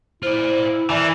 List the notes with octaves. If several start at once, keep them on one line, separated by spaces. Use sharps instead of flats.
E4 F4 C5 D5
E3 A#4 D5 G#5